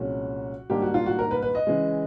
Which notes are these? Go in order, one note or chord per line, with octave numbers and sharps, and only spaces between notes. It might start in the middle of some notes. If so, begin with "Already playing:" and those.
Already playing: C2 A#2 F3 G#3 C#4 F#4
G#2 D#3 G3 A#3 D4 G4
F#4
F4
F#4
A#4
B4
B4
D#5
C#3 E3 G#3